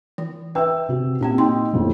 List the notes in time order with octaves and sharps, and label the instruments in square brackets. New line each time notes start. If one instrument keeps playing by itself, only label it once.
[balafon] E3
[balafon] B4 E5 [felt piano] G5 E6
[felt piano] C3 F#4
[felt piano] A#2 [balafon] A#3 C4 G4
[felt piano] D#4 G5 [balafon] C6
[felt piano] D#1 F2 A2